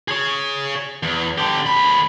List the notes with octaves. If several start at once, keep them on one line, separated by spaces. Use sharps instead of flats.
G#4 C#5
E2
D3 G4
D2 B5